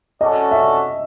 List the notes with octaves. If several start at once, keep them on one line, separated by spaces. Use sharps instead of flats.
C#4 F#4 A4 D5 D#5
E5